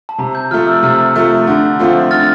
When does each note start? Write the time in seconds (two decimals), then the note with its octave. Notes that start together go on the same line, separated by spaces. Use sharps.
0.09 A5
0.18 C3 A#5
0.35 G6
0.51 F3 A3 F6
0.67 E6
0.83 C3 F6
1.16 F3 A3
1.47 D3
1.79 F3 A3 C4 F4
2.11 D3 F6 A6